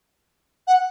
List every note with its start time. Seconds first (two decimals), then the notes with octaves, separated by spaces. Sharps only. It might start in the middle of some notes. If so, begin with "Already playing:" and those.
0.67 F#5